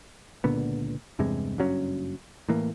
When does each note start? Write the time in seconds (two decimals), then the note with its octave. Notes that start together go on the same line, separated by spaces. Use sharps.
0.44 C#2 A#2 D3 B3
1.19 E2 G2 C3 G#3
1.58 F#1 G2 F#3 C#4
2.49 A2 E3 A#3